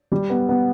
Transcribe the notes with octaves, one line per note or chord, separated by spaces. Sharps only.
G3
B3
B3